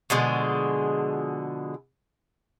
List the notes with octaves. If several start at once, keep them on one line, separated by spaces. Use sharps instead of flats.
B2 D3 F3 G#3